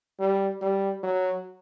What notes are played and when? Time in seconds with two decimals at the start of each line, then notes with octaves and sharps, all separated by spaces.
0.20 G3
0.62 G3
1.03 F#3